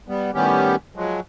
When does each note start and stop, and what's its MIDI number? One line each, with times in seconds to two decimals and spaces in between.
0.08 0.31 55
0.08 0.31 59
0.34 0.76 45
0.34 0.76 51
0.34 0.76 55
0.34 0.76 59
0.34 0.76 61
0.34 0.76 67
0.95 1.20 53
0.95 1.20 54
0.95 1.20 56